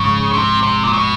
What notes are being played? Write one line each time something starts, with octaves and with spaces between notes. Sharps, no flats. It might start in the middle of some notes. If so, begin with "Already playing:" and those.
Already playing: G#2 C#3 F3 G#3
C3
C3
A#2
B2